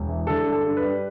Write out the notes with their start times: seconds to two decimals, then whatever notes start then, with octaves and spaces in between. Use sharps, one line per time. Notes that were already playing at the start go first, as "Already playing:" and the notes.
Already playing: E1
0.08 E3
0.27 D3 A4
0.46 G2
0.52 A4
0.64 G2
0.77 B4
0.83 G3